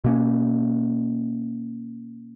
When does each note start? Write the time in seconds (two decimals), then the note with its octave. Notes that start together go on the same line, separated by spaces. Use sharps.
0.04 B2 A#3 C#4